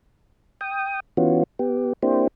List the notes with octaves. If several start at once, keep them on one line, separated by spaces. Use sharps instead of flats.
G5 D#6
E3 B3 C#4 F4 F#4
B3 G4
A#3 C4 D4 E4 G4 C5